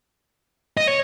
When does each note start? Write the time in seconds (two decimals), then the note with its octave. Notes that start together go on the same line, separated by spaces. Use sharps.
0.77 D#5
0.87 C#5